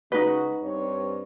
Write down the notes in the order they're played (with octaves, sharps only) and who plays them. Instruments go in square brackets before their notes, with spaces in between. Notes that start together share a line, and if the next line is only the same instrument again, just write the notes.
[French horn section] C#3 G#3 F#4 [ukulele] D#4 B4
[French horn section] G2 C4 C#5